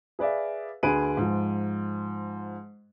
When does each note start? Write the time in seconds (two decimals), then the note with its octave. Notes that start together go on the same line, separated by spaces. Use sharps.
0.19 G#4 B4 D5 E5 F5
0.83 D2 D3 G#4 B4 D7 D#7
1.17 G#2 F3